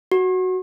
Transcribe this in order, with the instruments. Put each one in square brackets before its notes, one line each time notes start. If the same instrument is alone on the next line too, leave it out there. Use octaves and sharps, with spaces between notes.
[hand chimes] F#4